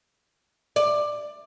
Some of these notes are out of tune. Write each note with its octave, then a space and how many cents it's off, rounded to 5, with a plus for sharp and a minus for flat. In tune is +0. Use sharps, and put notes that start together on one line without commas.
D5 +15